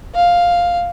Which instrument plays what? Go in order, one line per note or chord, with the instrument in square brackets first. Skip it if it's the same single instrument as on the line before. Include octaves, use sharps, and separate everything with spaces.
[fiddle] F5